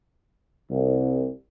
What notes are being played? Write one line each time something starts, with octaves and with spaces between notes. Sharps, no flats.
C2